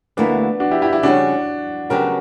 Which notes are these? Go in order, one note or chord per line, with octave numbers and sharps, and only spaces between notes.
D2 D3 A#3 B3 D4 E4 A#4
D4 F#4
E4 G4
E4 G4
E4 G4
C#3 G3 C#4 D4 F#4
C#3 F#3 B3 D4 F#4 G4 A#4